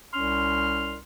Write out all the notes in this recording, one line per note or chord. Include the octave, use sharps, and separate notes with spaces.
C2 C#4 C6 F6